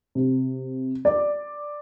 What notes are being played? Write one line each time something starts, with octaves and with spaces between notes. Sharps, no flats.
C3
D5